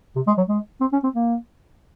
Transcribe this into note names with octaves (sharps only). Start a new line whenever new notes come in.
C3
G#3
F#3
G#3
C4
C#4
C4
A#3